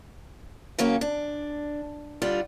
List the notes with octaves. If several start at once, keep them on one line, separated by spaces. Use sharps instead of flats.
C#3 F#3 A#3 C#4
D4
D3 G3 F4